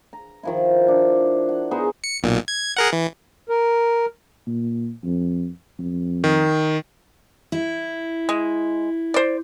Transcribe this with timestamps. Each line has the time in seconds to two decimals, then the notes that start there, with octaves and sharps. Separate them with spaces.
0.13 A#5
0.43 D#3 F3 E4
0.88 D4
1.49 F#5
1.71 B3 D#4 G#4 C5
2.04 C#7
2.23 B1 A#2
2.48 G#6
2.77 G#4 A#4 F#5
2.93 E3
3.49 A#4
4.47 A#2
5.03 F2
5.78 F2
6.24 D#3
7.52 E4
8.29 G#3
9.14 C5 D5